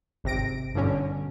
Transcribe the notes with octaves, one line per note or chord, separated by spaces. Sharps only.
G#1 C3 A#6 D7
G2 B2 D3 C#4